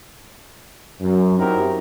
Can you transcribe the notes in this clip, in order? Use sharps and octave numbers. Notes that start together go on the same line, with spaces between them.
F#2
C4 D#4 E4 F#4 G4 A#4